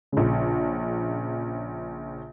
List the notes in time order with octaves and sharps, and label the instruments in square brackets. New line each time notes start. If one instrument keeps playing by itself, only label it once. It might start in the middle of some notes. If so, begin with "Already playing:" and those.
[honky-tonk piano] A#1 C#3